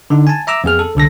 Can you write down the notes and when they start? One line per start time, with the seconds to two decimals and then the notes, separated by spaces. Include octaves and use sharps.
0.10 D3 D#4
0.27 G#5 A5
0.47 E5 A#5 D6 E6
0.64 F2 B3 G#4 F6
0.79 A4
0.95 C2 D3 A4 A#6